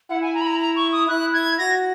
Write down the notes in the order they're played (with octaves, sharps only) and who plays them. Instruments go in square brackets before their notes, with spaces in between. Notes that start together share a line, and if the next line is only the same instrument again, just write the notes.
[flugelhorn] E4 [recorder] F#5
[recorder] G#5
A#5
B5
A#5
A#5
C#6
D#6
[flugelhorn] E4 [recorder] F#6
[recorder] G#6
[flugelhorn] F#4 [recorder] A#6